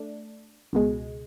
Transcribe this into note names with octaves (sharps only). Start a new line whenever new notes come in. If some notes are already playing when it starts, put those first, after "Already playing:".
Already playing: A3 D4
C#2 B2 G#3